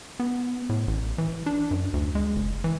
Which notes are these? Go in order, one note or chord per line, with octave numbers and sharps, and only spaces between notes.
B3
A2
A1
E3
D4
F#2
D2
G#3
F#1
E3